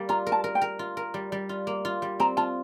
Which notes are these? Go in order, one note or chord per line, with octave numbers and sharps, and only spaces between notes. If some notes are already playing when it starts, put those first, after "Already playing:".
Already playing: G3 A#3
F4 A#5
A#4
A5
A#4
G5
A#4
F4
A#4
G3
G3
F4
A#3
F4
G3
C4 A#5
F4 A5